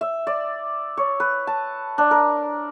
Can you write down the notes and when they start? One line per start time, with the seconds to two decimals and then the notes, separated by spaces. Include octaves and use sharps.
0.01 E5
0.27 D5
0.97 C#5
1.20 B4
1.47 A5
1.98 D4
2.11 A#4